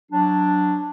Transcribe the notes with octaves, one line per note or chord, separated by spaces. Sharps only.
F#3 D4